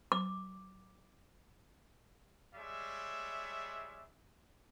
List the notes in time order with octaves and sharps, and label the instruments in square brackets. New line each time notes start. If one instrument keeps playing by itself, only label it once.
[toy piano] D6
[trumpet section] G3 G#3 C#5 E5